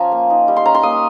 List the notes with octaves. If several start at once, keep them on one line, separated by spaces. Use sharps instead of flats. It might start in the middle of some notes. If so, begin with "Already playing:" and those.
Already playing: F3 C#4 F4 G#5 A#5
A#3
D#4
G3
C6
C#4 A#5
C6
A#3 D#6